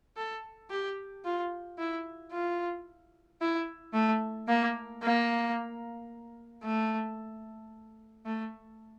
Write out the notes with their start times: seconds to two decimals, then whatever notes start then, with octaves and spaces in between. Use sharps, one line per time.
0.17 A4
0.70 G4
1.24 F4
1.78 E4
2.32 F4
3.41 E4
3.94 A3
4.48 A#3
5.02 A#3
6.63 A3
8.26 A3